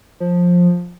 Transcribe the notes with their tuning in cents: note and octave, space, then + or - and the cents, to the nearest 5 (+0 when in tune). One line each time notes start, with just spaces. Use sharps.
F3 +15